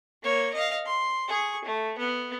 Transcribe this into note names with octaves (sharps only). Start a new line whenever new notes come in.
A#3 C#5
D#5 F5
C6
G#4 C#6
A3
B3